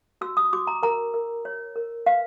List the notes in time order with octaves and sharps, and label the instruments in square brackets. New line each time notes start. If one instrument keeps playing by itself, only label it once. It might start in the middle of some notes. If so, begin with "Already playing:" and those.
[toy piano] F#4 E6
D#6
F#4 D6
A#5
A#4 A#5
A#4
C#5
A#4
B4 F5